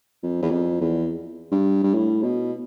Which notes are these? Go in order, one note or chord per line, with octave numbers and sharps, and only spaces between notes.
F2
E2
F2
E2
G2
G2
A2
B2